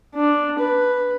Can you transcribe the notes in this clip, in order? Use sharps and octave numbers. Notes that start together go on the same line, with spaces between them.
D4
B4